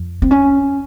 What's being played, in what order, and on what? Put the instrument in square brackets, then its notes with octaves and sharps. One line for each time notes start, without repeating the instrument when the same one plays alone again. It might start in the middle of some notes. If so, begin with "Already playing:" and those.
Already playing: [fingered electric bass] F2
[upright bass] C4
C#4